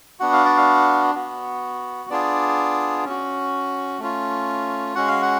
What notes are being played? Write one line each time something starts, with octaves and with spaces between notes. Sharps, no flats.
B3 D4 F#4 F#5
F5
D5
F5
B3 F#4
B3 D4 F4 G#4 D5
C#4 F#4
A3 C#4 F4
G#3 C#4 F#4 F#5
F5
F#5